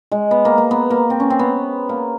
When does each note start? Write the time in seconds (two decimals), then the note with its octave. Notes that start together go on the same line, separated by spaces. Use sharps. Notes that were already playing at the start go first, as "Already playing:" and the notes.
0.12 G#3
0.31 B3
0.45 A#3
0.58 A#3
0.71 B3
0.90 A#3
1.10 C4
1.20 C#4
1.30 C4
1.39 B3
1.89 A#3